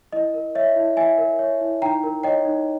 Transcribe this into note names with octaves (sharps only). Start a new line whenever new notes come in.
E4 D#5
A#4
C#5 E5
E4
E4 E5 G#5
A#4
C#5
E4
D#4 G5 A#5
A#4
C#5 D#5 G5
D#4